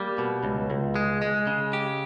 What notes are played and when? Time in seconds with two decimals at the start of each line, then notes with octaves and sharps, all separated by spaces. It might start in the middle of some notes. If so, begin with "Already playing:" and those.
Already playing: G3 A#3
0.18 B2
0.44 C#2
0.70 C#2
0.96 G#3
1.22 G#3
1.47 C#3
1.73 G4